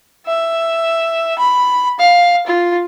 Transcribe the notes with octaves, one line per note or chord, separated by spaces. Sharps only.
E5
B5
F5
F4